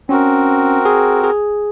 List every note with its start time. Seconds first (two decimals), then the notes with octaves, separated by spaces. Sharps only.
0.09 C4 C#4 F#4 A#4
0.85 G#4
1.24 G#4